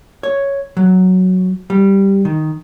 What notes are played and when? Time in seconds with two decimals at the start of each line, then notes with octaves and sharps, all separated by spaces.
0.23 C#5
0.77 F#3
1.70 G3
2.25 D#3